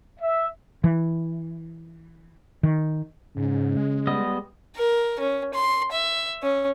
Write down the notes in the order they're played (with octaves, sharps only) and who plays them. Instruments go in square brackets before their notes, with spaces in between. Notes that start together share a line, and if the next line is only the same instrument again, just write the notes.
[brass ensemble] E5
[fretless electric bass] E3
D#3
[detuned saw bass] G#2 [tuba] C#3
[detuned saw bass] G#3
[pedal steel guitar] G3 B3 D#5
[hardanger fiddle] A#4
C#4
C6
E5
C#4